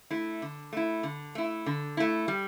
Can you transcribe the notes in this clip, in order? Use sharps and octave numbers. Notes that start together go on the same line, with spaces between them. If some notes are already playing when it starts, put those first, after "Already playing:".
A3 E4
D3
A3 E4
D3
A3 E4
D3
A3 E4
G3